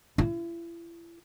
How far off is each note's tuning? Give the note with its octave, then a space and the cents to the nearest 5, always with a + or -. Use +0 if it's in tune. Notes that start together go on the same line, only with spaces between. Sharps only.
E4 +40